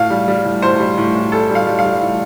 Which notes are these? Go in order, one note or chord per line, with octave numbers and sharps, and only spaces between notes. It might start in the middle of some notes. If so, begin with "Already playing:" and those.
Already playing: A2 F5
G3
G3
A2
A2 C5
G3
A2
A2
G3 A4
G3
F5
G3
F5
G3
A2